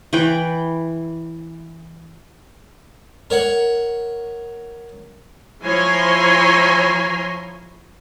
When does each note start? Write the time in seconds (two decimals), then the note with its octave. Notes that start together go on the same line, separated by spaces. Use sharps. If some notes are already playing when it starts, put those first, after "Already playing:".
0.13 E3 B4 G5
3.30 A#4 C#5 F#5
5.64 F3 E4 C#5 G#5 A#5 C6